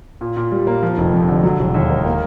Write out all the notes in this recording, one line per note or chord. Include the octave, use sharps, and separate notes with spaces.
A#2
A#2
G3
A#3
F3
F1
F2
D3
F#3
E1
D#2
D#3
A#3